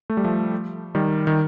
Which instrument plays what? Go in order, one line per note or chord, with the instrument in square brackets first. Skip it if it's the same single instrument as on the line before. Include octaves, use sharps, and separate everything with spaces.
[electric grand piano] A3
G3
F3 A3
D#3 G3
D#3